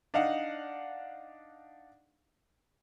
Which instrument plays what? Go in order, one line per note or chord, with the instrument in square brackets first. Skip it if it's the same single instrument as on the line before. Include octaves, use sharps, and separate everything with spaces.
[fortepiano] D4 D#4 F5 F#5